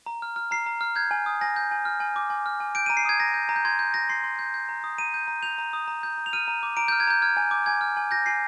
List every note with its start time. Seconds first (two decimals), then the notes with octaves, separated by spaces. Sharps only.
0.06 A#5
0.22 F6
0.36 F6
0.51 A#5 C7
0.66 A#5
0.81 F6
0.96 G6 G#6
1.11 G#5
1.26 D#6
1.41 G#5 A#6
1.56 G6
1.71 G#5
1.85 F6
2.00 G#5
2.16 D6
2.30 G#5
2.46 F6
2.60 G#5
2.75 G6 D7
2.86 A#5 D#7
2.97 C7
3.05 D#6 G#6
3.20 A#5 A#6
3.34 G6
3.49 A#5
3.56 G6
3.65 C6 G#6
3.79 G6
3.94 G6 A#6
4.09 C6 C7
4.24 C6
4.39 G6
4.54 G6
4.69 A#5
4.84 D#6
4.98 A#5 D#7
5.14 G6
5.28 A#5
5.43 G6 F7
5.58 A#5
5.73 D#6
5.88 A#5
6.03 G6
6.18 A#5
6.26 F7
6.33 F6 D#7
6.48 A#5
6.63 D6
6.77 A#5 D7
6.88 F6 G6
7.00 G#6
7.07 A#5 G6
7.22 F6 G#6
7.37 G#5
7.51 D6
7.66 G#5 G#6
7.81 F6
7.97 G#5
8.11 G6 A#6
8.26 G#5 C7